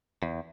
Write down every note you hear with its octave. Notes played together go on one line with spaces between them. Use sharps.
E2